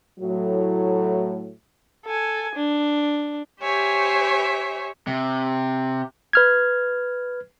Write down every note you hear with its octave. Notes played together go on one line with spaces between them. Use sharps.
A2 F#3
A4 G#5
D4
G4 C5 C#5 E5 G#5
C3
B4 F6 G#6